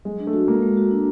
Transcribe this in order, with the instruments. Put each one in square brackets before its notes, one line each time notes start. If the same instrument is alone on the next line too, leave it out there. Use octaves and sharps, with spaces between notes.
[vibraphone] F#3 [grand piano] G#3
[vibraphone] D4
[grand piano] A3
[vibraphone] F#4
[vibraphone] G#3 [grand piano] A#3
[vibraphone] G#3
F#4
D4